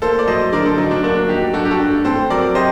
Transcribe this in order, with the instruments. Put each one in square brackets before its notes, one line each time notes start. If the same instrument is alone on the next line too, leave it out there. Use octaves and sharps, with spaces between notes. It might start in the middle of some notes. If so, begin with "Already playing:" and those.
[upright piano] A#3 [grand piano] A4 C5
[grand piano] D5
[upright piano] F#3 [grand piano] C5 D#5
[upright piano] D3 [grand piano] A#4 D5
[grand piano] A4 C5
[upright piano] F#3 [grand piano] C4 D#4
[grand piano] D4
[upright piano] A#3 [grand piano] D4 F#4
[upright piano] F#3 [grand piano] D#4 G4
[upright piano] G2 [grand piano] F#4 A4
[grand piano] G4
F#4 A4
[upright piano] G2
[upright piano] C4 [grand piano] A4 C5
[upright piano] F#3 [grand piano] A#4 D5
[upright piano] G4 [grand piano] C5 D#5